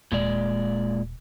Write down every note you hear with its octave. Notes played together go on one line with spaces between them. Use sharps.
D#1 A#2 G#3 D5